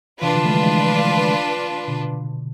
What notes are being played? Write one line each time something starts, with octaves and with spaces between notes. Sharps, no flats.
C3 E3 D4 F4 B4
D3 F3
A3
E3 G#3
E3 G#3
B2 D3